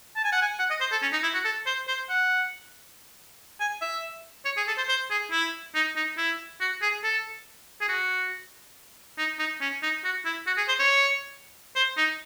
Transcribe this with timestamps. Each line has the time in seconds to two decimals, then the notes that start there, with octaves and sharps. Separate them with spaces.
0.16 A5
0.24 G#5
0.32 F#5
0.42 G#5
0.59 F#5
0.70 D#5
0.80 C5
0.92 A4
1.02 C#4
1.12 D#4
1.23 E4
1.34 F#4
1.45 A4
1.66 C5
1.88 C5
2.09 F#5
3.60 G#5
3.81 E5
4.45 C#5
4.57 G#4
4.68 A4
4.78 C5
4.89 C5
5.11 G#4
5.31 E4
5.75 D#4
5.96 D#4
6.17 E4
6.60 F#4
6.82 G#4
7.04 A4
7.81 G#4
7.89 F#4
9.18 D#4
9.39 D#4
9.61 C#4
9.83 D#4
10.04 F#4
10.25 E4
10.47 F#4
10.57 G#4
10.68 C5
10.79 C#5
11.76 C5
11.97 D#4